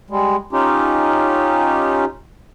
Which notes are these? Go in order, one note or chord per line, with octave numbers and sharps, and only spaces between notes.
G3 G#3
C#4 D#4 F4 G4